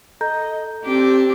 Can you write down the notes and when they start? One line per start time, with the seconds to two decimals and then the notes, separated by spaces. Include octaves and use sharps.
0.21 A4 D#5 A#5 G6
0.85 C4 D4 G4